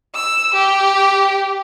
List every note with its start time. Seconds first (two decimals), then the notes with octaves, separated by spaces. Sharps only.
0.15 E6
0.54 G4